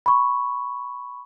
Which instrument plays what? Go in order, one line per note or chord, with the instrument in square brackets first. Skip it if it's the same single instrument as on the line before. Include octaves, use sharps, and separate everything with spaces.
[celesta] B5 C#6